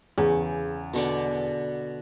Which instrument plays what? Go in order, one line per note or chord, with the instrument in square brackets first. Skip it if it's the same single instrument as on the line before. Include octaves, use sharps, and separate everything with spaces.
[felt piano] E2 [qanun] C#3
[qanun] B2 D3 D5